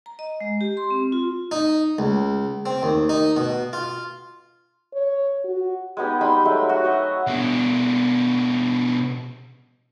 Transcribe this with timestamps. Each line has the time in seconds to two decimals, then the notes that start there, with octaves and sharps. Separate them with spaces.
0.06 A#5
0.19 D#5
0.40 G#3
0.61 G4
0.77 C6
0.91 C4
1.12 F4
1.51 D#4
1.99 C#2
2.66 C4
2.83 D#2
3.09 D#4
3.37 B2
3.73 F4
4.94 C#5
5.45 F#4
5.97 G#3 B3 D#4 G4
6.21 G3 D#4 B5 C6
6.45 F#3 G#3 A3
6.69 F#4
6.84 C#5 D#5 E5
7.27 B2 D4